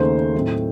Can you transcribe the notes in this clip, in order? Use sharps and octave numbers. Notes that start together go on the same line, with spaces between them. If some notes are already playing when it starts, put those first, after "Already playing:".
Already playing: D#2 C#3 A3 D#4 C5
A2 F#3 A3 C4 D#4